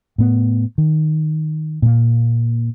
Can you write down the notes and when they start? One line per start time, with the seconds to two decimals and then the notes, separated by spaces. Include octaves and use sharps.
0.18 A2 B3
0.78 D#3
1.82 A#2 A#3